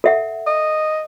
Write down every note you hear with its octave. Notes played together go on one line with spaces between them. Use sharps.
A4 E5 F#5
D#5